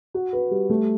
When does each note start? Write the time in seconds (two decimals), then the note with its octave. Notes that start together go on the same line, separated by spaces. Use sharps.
0.14 F#4
0.33 B4
0.51 G3
0.69 A3